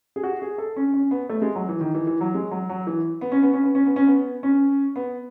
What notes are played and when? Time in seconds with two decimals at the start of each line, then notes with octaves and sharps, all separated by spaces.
0.16 G#4
0.23 F#4
0.42 G#4
0.58 A4
0.76 C#4
0.94 C#4
1.11 B3
1.29 A3
1.42 G#3
1.55 F#3
1.69 E3
1.81 D#3
1.95 E3
2.07 E3
2.21 F#3
2.34 G#3
2.51 F#3
2.69 F#3
2.87 E3
3.21 B3
3.32 C#4
3.43 B3
3.54 C#4
3.64 B3
3.75 C#4
3.86 B3
3.96 C#4
4.07 B3
4.43 C#4
4.96 B3